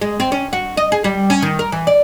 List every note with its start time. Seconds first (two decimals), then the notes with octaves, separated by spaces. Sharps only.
0.01 G#3
0.20 C4
0.32 C#4
0.53 F#4
0.77 D#5
0.92 G#4
1.04 G3
1.30 C#4
1.42 D#3
1.59 A#4
1.72 E3
1.87 D5